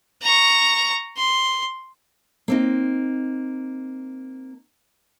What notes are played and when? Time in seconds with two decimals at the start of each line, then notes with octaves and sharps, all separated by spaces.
0.22 A#5 C#6
1.17 C6
2.48 A#3 C4 D#4